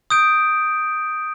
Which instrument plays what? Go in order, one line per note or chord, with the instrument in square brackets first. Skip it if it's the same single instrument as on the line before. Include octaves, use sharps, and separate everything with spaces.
[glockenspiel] D#6 G6 D7